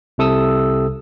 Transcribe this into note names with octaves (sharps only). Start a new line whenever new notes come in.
C2 C3 A4 D#6 E6